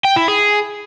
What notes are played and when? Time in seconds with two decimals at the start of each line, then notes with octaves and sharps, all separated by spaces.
0.05 G5
0.16 E4
0.28 G#4